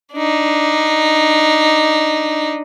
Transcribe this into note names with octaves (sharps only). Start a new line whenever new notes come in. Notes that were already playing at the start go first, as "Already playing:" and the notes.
D4 D#4